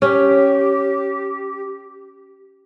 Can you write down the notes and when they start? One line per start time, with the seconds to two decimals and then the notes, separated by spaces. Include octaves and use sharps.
0.02 C#4 G4